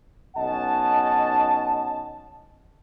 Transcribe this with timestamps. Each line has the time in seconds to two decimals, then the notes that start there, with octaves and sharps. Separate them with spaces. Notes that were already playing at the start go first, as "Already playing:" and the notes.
0.37 B1 C#4 D#5 F#5 A5